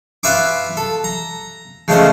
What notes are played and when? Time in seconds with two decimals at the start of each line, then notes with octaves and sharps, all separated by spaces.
0.23 F4 B4 E5 G#5 C#6 D6
0.77 A4
1.04 A#5
1.88 C#3 F3 G#3 A3 C#4 C5